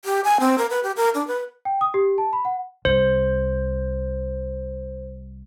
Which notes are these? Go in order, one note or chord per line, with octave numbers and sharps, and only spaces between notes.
G4
G#5
C4
A#4
B4
G4
A#4
D4
B4
G5
D#6
G4
A5
B5
F#5
C2 C5